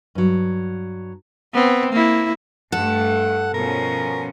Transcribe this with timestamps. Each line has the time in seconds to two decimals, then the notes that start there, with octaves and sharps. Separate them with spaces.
0.15 G2 F#3
1.53 B3 C4
1.92 A#3 E4
2.72 G2 A3 A4 F#5
3.54 B2 F3 C#4 A#4